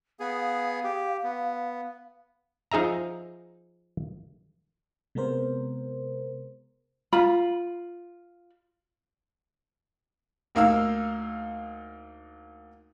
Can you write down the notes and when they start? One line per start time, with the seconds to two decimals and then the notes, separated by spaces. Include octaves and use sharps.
0.20 B3 G#4 F5
0.84 G4
1.24 B3
2.72 F3 D#4 G#4 E5 A#5
5.15 C3 G#3 B3 A#4 C5
7.13 F4 B5
10.55 D2 A#3 D#4 F5 E6